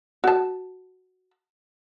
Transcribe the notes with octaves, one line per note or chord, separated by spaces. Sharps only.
F#4 A5